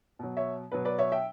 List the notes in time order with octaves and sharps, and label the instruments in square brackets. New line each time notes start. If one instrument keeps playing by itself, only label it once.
[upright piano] B2 F#3
C#5 E5
B2 F#3 B4
B4 D5
C#5 E5
E5 G5